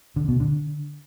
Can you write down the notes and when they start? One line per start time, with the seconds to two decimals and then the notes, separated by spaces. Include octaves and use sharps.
0.16 D3
0.28 B2
0.40 D3